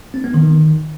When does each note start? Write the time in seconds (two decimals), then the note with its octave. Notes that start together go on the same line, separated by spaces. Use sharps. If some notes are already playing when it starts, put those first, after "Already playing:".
0.14 C4
0.24 B3
0.34 D#3